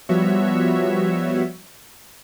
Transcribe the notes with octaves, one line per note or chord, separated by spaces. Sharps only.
F3 G3 B3 F#4 C#5 E5